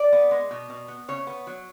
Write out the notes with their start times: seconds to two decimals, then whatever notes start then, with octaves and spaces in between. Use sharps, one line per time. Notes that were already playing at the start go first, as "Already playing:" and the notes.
Already playing: D5
0.13 B3
0.31 G#3
0.51 B2
0.70 B2
0.88 B3
1.08 C#3 C#5
1.27 B3
1.47 F#3